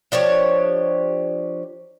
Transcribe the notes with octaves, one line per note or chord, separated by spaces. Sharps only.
F3 D4 G4 C#5